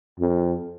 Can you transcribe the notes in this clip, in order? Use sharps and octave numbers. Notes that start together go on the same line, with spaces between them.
F2